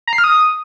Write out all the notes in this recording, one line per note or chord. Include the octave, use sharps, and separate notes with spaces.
A#5
C7
F6
D#6